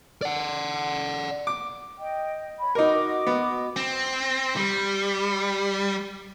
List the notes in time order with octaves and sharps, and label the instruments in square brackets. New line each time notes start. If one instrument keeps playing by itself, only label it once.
[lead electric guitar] D5 F#5
[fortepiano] D6
[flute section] D#5 G5
C#5 B5
[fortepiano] D#4 A#4 [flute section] F#4 D#5 D6
[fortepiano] B3
[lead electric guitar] C4
G3